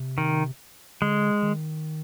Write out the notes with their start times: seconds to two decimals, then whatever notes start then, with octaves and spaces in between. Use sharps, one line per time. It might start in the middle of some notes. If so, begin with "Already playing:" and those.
Already playing: C3
0.18 D#3
1.01 D3 G#3
1.42 D#3